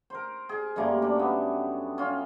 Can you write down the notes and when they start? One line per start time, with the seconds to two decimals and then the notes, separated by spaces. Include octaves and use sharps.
0.10 A#4 C5
0.49 G#4
0.76 F#2 G3 A3 A#3
1.02 D4
1.19 B3
1.98 C#4 F4